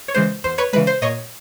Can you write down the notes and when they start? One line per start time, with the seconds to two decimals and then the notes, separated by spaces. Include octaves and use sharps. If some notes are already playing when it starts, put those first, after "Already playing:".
0.08 C#5
0.15 C#3 E3 G#3 C5
0.44 E2 C5
0.58 B4 C#5
0.73 C#3 E3 G#3 B4
0.87 C5
1.02 A#2 C#5 D#5